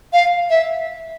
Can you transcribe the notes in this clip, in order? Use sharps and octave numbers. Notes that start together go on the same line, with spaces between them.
F5
E5